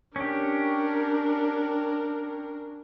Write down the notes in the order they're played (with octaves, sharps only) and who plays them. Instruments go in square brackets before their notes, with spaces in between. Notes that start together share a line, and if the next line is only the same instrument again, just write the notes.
[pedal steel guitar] C#4 G4 [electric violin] D4 A#4